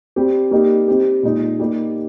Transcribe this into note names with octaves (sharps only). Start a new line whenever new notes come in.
G3 C4 G4
G3 A#3 D#4 G4
G3 C4 G4
A#2 G#3 D#4
G3 A#3 D#4 G4